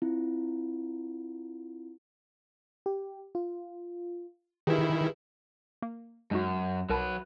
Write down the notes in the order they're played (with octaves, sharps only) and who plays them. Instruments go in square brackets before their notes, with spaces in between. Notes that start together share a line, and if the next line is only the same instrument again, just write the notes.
[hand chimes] C4 E4 F4
[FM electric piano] G4
F4
[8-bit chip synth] D#3 E4 [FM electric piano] G4 G#4 B4
[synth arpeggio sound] A#3
[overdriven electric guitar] F#2 [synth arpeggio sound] G#3 D#4 F#4
[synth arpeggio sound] C2 A#4 A5 [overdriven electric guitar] F#3 B4